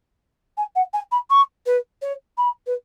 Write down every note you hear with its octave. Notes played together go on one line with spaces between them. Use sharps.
G#5
F#5
G#5
B5
C#6
B4
C#5
B5
B4